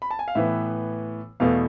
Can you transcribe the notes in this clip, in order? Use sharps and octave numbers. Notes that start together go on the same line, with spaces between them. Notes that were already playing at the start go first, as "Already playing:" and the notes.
B5
A5
G#5
F5
A2 E3 B3 E5
E2 B2 A3 F5